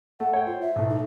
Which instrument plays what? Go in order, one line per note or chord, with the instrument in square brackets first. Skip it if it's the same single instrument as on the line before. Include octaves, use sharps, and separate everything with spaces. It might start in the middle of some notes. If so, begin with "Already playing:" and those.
[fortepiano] A3 [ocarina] F#5
[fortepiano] C#5 G5
[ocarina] F4 [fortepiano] C5
[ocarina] E5
[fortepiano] B1 A2
[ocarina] D#4